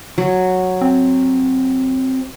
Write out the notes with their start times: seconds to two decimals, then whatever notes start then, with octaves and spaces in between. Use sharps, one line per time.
0.18 F#3
0.81 C4